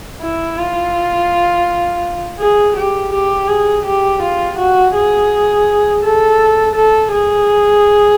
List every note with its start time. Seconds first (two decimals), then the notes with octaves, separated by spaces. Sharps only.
0.22 E4
0.58 F4
2.39 G#4
2.76 G4
3.13 G4
3.48 G#4
3.85 G4
4.22 F4
4.58 F#4
4.94 G#4
6.03 A4
6.75 A4
7.12 G#4